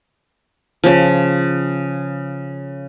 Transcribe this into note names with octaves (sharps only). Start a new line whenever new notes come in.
C#3 F3